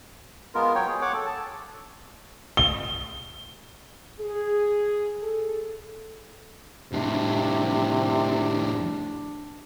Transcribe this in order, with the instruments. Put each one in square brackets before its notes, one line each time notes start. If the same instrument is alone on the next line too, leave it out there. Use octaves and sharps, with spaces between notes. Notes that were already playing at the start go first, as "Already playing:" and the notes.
[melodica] G#3 B3 F4 A#4
F#3 C#5 G5
G#4
C#5 F#5 D6
A4
A5
[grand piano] G7
[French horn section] G#4
A4
[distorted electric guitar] F2 A2 [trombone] C3 [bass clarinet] D4